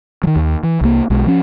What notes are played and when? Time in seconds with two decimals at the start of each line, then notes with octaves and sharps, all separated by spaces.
0.24 D#3 F#3
0.36 D#2
0.63 E3
0.81 C2 A#3
1.10 B1 G#3
1.26 F3 C#4